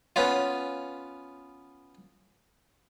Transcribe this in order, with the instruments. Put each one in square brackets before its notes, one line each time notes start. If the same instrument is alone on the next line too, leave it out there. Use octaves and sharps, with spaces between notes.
[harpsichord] B3 C#4 F4